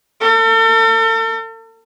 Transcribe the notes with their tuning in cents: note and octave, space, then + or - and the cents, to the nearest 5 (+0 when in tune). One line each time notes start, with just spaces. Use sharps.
A4 +40